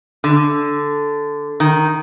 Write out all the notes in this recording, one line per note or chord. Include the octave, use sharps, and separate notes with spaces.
D3
D#3